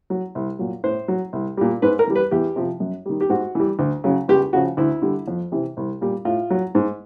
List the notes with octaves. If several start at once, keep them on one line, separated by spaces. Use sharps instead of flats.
F#3
C2
A#2 F#3
A2 C5
F#3
C2
A#2 G3
G#2 B4
A#4
E3 G3
B4
E2 G4
C3 F3
F#2
D#3 G3
G4
G#2 F#4
E3 G3
D2
C#3 F#3
C#2 G4
C#3 F3 F#4
D2 E4
D3 G3
F2
C3 E3
C2
A#2 G3
A2 F4
F#3
G#2